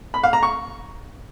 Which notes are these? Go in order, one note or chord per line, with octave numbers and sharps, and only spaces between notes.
B5
F5
A#5
C#6